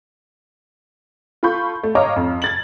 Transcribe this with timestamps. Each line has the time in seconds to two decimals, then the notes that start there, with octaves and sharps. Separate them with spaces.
1.43 F4 A4 B5 C#6 G6
1.84 A3
1.95 C#5 D#5 F5 A#5 D6 F6
2.16 F2
2.42 G#6 A6 F#7